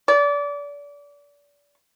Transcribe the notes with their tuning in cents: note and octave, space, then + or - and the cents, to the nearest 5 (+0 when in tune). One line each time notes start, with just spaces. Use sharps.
D5 -30